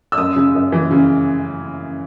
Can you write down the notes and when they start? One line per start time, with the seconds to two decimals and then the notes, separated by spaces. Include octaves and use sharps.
0.12 E6
0.18 F#2 D#6
0.36 C#3
0.55 F#2
0.72 E3
0.91 C#3